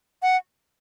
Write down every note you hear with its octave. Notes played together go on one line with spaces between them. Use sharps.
F#5